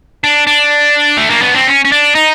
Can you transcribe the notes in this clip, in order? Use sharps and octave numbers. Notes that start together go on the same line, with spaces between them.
D4
D4
A3
A#3
B3
C4
C#4
C#4
D4
D#4